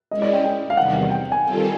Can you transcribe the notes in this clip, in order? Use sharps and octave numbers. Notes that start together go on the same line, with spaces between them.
G#3 C#4 E4 D#5
D5
G5
G5
F5
E2 C3 D#3 G3 F#5
G5
G#5
D#3 G3 C4 F4 A4